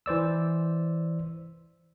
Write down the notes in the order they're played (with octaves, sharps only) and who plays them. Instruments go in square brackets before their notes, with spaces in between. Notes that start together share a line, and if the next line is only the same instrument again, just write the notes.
[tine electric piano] E3 C5 D5 E6